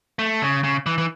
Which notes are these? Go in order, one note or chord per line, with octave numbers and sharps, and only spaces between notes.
A3
C#3
C#3
E3
E3